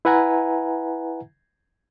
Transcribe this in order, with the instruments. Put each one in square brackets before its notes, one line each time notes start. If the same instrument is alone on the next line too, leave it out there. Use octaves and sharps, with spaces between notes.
[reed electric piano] E4 B4 E5 F#5 G#5 A#5